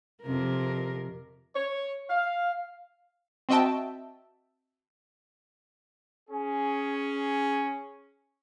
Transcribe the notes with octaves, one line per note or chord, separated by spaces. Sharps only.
F2 C3 A#4
C#5
F5
C4 F#4 D#5 E5 G5 A5
C#4 G#4